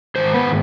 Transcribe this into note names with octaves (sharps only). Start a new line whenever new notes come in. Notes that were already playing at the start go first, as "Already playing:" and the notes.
G#2 D#3 C5
B3 B4